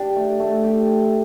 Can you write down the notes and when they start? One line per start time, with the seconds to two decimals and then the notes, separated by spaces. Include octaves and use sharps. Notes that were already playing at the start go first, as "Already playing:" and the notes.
Already playing: D4 G4
0.16 A3
0.40 A3
0.64 G4